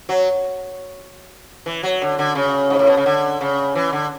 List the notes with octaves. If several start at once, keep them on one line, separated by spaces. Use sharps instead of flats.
F#3
E3
F#3
D3
D3
C#3
G#2
A2
B2
C#3
D3
C#3
E3
D3